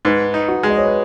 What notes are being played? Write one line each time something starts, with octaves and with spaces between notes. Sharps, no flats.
G#2 B4
D#4
F#4
G#3
D#5
C#5
B4